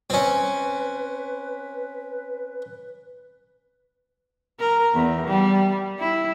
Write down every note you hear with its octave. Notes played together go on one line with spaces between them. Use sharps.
C4 C#4 B4
A#4
E2
G3
E4